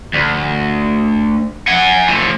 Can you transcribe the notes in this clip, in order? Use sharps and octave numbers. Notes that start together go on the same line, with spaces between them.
D2
F#5 G#5
A3 F4